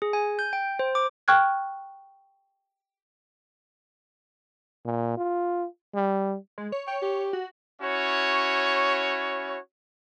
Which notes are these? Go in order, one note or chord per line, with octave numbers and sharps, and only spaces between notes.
G#4
G#5
G6
G5
C5
D6
G5 C#6 F6 F#6 G#6
A#2
F4
G3
G#3
C#5
C#5 G5
G4
F#4
C#4 E4 F#4 C#5